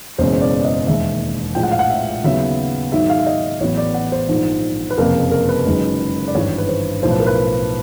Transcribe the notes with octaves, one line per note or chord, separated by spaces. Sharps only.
F#1 E2 B2 G#3 C#4 C5
D5
D5
D#5
E1 D#2 D#3 G#3 E5
A#1 A2 F3 G#3 G5
F#5
F5
F#5
E5
D#2 C#3 F#3 B3 E5
G#2 D#3 F#3 E5
F5
E5
D#5
A1 A2 F#3 B3 C#5
D5
F#5
C5
A#1 G#2 D#3
B4
F#1 F2 C3 F3 A#3 A#4
A#4
B4
F#1 F#2 D#3 G#3 C#4
D5
G#1 G2 E3 C#5
B4
C5
B1 A2 F3 C5
B4
A#4
B4